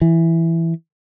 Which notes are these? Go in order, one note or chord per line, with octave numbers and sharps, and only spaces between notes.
E3